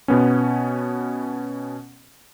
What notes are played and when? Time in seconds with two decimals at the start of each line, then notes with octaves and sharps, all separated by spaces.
0.08 B2 B3 C#4